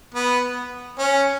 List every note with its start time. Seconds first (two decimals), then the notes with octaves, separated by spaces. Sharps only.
0.15 B3
0.99 C#4